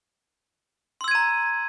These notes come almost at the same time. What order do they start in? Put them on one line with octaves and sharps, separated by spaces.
C6 E6 G#6 D#7 A#5